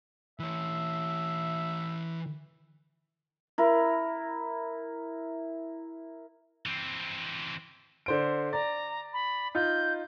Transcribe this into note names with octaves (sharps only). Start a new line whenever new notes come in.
E3 C#5 E5
E4 A#4
E3 C4
D3 C5 D7
D5 A#5
B5
D#4 F4 G6